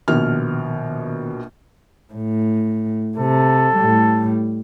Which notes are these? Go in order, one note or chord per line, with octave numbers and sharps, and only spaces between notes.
A#1 B2 D#3 B3 F6
A2
C3 A4
A2 G3